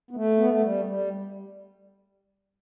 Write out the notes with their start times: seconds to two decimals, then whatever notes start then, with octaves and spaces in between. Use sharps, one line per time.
0.11 B3
0.16 A3
0.37 B3
0.50 A3
0.62 G3
0.85 G3